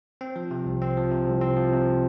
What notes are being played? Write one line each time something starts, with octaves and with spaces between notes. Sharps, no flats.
C4
F3
C3
C2
C4
F3
C3
C2
C4
F3
C3